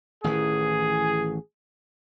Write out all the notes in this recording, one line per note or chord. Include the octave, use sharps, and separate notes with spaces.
A1 D#3 E3 G#4